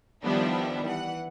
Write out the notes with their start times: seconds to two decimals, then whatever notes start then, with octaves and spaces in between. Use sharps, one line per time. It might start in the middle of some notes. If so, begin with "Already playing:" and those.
0.24 D#3 F3 G3 B3 D4 E4
0.86 E3 F#5